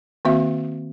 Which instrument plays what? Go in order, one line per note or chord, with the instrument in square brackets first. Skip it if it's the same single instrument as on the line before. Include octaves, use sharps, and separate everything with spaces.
[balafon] D#3 A#3 C4 F#4 E5